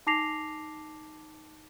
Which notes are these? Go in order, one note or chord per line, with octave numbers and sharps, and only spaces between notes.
D#4 A5 D6 A#6 C7 F7